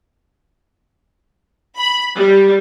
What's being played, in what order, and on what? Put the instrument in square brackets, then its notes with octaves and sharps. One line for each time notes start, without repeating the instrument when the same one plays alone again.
[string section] B5
G3